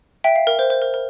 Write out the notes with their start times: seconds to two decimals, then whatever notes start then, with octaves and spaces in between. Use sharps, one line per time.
0.24 E5 G5
0.36 F5
0.47 A#4
0.59 C5
0.70 C5
0.82 A#4
0.94 A#4